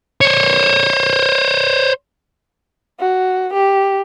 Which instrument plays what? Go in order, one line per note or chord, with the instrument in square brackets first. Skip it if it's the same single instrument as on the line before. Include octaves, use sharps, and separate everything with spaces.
[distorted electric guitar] C5 C#5
[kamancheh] F#4
G4